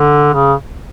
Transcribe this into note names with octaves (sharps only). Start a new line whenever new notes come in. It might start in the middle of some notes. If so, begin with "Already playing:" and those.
Already playing: D3
C#3